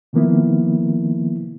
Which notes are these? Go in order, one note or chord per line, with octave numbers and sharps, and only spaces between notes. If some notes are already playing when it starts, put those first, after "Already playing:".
C3 D#3 F3 A#3 B3 E4